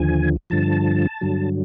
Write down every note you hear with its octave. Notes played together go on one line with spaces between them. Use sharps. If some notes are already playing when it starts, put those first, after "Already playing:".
Already playing: D#2 D3 F3 G#5
G2 D3 F3 A5
G2 D3 F#3